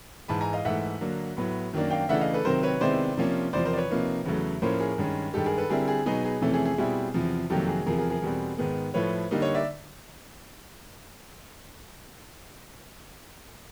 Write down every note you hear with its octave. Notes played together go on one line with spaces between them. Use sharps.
G#2 E3 G#3 A5 B5
G#5 A#5
D#5 F5
G#2 E3 A3 E5 F#5
D3 F#3 A#3
A2 F#3 B3
F#2 D#3 F#3 A#3 D4
F5 G5
C#3 E3 A3 D4 E5 F#5
D#5 F5
A4 B4
C3 D#3 F#3 A#4 C5
B4 C#5
C3 D#3 G#3 B3 E4 C5 D5
C3 F3 A#3 C#4
E2 C3 F3 C5 D5
A#4 C5
D5
B4 C#5
C3 F3 A#3 D#4
E2 C#3 F#3 A3
A2 F3 A#3 C#4 A#4 C5
G#4 A#4
G2 D#3 G#3 C#4
G2 D#3 G#3 G4 A4
G#4 A#4
A4 B4
D3 G3 C4 E4 G#4 A#4
G#4
B2 F#3 B3 D#4 G#4
G#4
F2 C3 E3 A3 C#4
G#4
G#4
B2 G3 C4 E4
E2 C3 F3
F2 C3 D#3 F#3 A#3 G4 A4
G#4
E2 C3 F3 G#4 A#4
G#4 A#4
G#4 A#4
E2 B2 G3 C4
G#2 D#3 G#3 B3
A2 F3 A3 B4 C#5
D3 G3 A#3 D#4
C#5 D#5
D5 E5